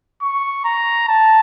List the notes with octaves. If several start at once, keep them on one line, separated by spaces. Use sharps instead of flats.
C#6
A#5
A5